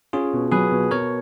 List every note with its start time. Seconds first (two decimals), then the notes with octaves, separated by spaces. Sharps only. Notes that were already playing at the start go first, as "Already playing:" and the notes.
0.13 C#4 F4 G#4
0.33 B2
0.52 F#3 G#4 B4
0.71 B2
0.91 B2 A#4 C#5